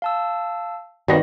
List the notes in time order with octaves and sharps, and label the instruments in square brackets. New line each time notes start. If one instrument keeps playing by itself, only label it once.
[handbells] F5 A5 E6
[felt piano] G#1 D5 A#6 [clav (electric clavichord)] D#2 B2 [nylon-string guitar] D#3 F#4 B4